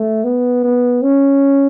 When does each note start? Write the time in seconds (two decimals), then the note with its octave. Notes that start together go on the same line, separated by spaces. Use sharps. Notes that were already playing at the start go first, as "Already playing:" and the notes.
Already playing: A3
0.24 B3
0.64 B3
1.02 C#4